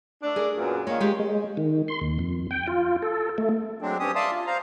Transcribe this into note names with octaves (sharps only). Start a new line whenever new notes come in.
A3 D4
G#4 A#4
F#2 A#2 B3
D#3 A#3 F4 C#5
G#3 G4
G#3
D#3
C6
D#2
F2
G5
F4
A4
A3
F#3 G#3 C4 D4
G2 C4 C#4 G4 D#6
D5 E5 F5 A5 C6 D#6
F4
C5 F5 A#5